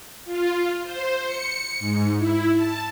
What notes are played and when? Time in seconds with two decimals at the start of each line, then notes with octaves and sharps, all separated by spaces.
0.25 F4
0.83 C5
1.25 C#7
1.79 G#2
2.18 E4
2.54 A5